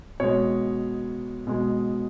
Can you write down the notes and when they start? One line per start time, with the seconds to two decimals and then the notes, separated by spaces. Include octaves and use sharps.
0.20 B2 G#3 C#5
1.47 B2 G#3